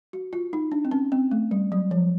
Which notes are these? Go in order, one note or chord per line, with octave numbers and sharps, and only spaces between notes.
F#4
F4
D#4
D4
C4
C#4
C4
A3
G3
F#3
F3